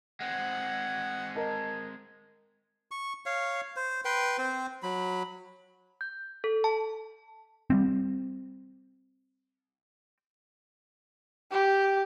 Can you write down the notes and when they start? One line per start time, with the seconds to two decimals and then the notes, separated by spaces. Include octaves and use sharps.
0.20 G#3 C4 F#5
1.35 A#4 D#5 A5
2.91 C#6
3.26 C#5 F5
3.76 C5
4.05 B4 G5 C6
4.38 C4 C5
4.83 F#3 B5
6.01 G6
6.44 A4
6.64 A5
7.70 G3 A3 C4
11.51 G4